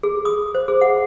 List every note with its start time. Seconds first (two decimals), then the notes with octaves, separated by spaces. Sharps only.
0.03 G#4
0.25 D#6
0.55 C5
0.68 G#4
0.81 F#5